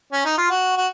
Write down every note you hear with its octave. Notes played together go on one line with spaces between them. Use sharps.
C#4
D#4
F4
F#4
F#4